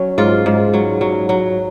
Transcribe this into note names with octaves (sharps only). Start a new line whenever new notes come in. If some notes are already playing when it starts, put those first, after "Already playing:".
Already playing: F#3 C#4
G#2 F4
G#2
F#3
F#3
F#3